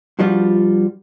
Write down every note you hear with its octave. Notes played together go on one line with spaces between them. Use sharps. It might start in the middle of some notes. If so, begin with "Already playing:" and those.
G2 F3 G3 B3 F4 F#4